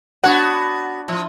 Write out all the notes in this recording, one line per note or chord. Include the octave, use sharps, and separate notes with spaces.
B3 D4 F#4 C#5 F#5
F3 E4 F4